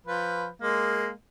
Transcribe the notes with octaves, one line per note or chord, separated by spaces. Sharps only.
F3 B4
G#3 A#3